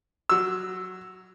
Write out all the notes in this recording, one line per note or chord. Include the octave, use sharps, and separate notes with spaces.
F#3 E6